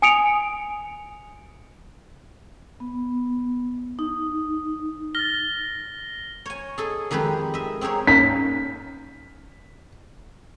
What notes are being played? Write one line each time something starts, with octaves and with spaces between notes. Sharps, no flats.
G#5 D#6 C#7 D7 F7
B3
D#4
F6 A6 A#6 G7
C#5 G#5
G#4 A4 D#5
F2 D#3 G#3 G4 B4
D#5 E5
C4 G4 G#4 A#4 C#5
A#3 C#4 D#4 B6